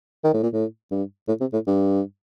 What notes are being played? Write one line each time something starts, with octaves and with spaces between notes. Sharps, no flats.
D#3
A2
A#2
A2
G2
A2
C3
A2
G2